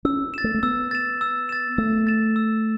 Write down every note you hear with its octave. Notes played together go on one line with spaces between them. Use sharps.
C#4 E6
A6 E7
A3
A3
B3 E6
A6 E7
E6
A6 E7
A3 E6
A6 E7
E6